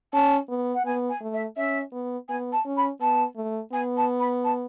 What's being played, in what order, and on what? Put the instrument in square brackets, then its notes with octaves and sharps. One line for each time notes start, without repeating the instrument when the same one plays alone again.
[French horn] C#4 [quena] A5
[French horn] B3
[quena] F#5
[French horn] B3 [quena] G#5
[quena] G#5
[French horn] A3
[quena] E5
[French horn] C#4 [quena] E5
[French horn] B3
[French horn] B3 [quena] G#5
[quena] A5
[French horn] C#4
[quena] B5
[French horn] B3 [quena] A5
[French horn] A3
[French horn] B3 [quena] G#5
[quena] A5
B5
A5